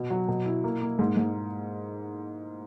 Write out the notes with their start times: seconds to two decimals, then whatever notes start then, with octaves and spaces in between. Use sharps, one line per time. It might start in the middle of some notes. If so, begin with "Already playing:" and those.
Already playing: B2
0.10 F#3
0.28 B2
0.46 E4
0.64 A#3
0.81 A#3
0.99 G#2
1.17 G#2